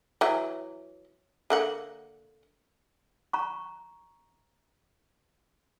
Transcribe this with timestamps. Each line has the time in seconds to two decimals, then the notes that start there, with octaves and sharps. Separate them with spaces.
0.21 E3 F#3
1.50 D3 A#3 F#5
3.33 A#5 C#6